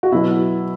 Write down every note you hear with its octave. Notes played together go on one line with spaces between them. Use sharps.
F#4
B2 F#3 E4